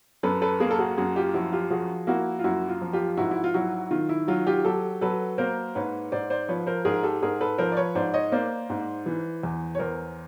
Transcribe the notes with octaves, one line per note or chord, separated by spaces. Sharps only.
F#2 A4 B4
A4 B4
A#3 G#4 A#4
A4
F#4 G#4
F#2 F#4 G#4
F4 G4
F3 E4 F#4
F4 G4
F3 F#4 G#4
A#3 E4 F#4
F4
F#2 E4 F#4
F4
F3
F4 G4
G#2 E4 F#4
E4
F4
F#3 E4 F#4
D#3 F4
E4
F#3 F4
F4 G4
F#3 G4 A4
F#3 A4 B4
A#3 A#4 C5
G#2 B4 C#5
G#2 C5 D5
C5 D5
F3 B4 C#5
A#4 C5
G#2 G#4 A#4
G4 A4
G#2 G#4 A#4
A4 B4
F3 A#4 C5
D5
B4 C#5
G#2 C5 D5
C#5 D#5
A#3 C5 D5
G#2
E3
E2
C#5
E2 A#4 C5